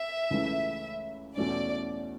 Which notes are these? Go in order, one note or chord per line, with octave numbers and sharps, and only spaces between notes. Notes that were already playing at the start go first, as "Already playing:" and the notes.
Already playing: E5
C#2 C#3 E3 A3 E4
E2 B2 A3 C#4 D5